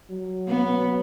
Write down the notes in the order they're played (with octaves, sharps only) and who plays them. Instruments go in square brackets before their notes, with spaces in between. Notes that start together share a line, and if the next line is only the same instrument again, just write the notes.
[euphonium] F#3
[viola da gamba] B3